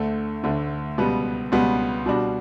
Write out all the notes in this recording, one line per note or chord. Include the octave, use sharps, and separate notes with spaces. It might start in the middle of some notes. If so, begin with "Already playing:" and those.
Already playing: D2 D3 A3
D2 D3 A3
C#2 B2 G3 B3
C#2 B2 G3 B3
B2 G3 D4 F#4